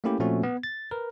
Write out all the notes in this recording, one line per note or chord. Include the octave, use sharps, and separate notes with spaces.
A3 A#3 C#4 E4 G4
A#2 F3 A3 C4 C#4 F#4
B3
A6
A#4 B4